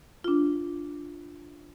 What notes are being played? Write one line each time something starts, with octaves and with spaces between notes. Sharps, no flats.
D4 F4